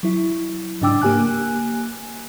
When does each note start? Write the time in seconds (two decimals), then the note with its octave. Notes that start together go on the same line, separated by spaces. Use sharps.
0.03 F#3 E4
0.81 G#2 C#3 D4 G5 D6 E6
1.02 A#3 G4 G#5 F#6